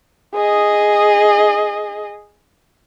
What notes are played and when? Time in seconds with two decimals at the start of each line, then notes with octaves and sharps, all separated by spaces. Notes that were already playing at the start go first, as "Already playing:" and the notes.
0.35 G#4 D#5